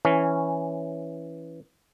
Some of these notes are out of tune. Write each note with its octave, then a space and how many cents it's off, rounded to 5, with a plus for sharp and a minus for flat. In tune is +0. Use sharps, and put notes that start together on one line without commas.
E3 +0 C#4 +0